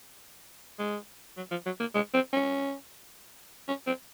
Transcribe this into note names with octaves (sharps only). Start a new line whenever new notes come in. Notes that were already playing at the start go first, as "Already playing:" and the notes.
G#3
F#3
F3
F#3
A#3
G#3
C4
C#4
C#4
C4